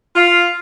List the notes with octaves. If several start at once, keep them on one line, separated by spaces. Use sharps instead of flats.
F4